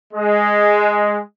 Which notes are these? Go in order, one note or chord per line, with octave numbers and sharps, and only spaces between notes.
G#3